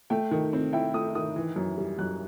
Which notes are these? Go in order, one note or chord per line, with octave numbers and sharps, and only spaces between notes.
A3 G5
D#3
C4
E4 G5
A3 D#6
D#3 D#6
E3
F#2
G3
F#2 F#6